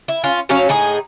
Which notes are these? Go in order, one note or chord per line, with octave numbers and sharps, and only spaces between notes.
E4
C#4 F4
F#3 C#4 C#5 F5
A2 D#4 G#4